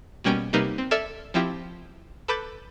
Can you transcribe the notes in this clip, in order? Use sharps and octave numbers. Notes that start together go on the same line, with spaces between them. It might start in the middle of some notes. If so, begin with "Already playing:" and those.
B2 G3 A#3 C#4 G5 D7
C3 G3 A#3 D#4 A#4 B4
C4
A4 D5 E5 F6 G#6 A6
F3 C4 E4 F4 G4
A4 B4 B5 D6 G6 A6